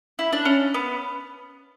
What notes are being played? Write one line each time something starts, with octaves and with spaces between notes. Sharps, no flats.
E4
D4
C#4
B3